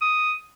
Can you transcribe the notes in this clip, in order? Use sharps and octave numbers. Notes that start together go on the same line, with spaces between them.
D#6